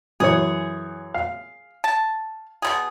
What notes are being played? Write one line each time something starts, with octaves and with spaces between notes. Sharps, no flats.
F#2 E3 G#4 C#5
F5
A5
B2 G3 G#4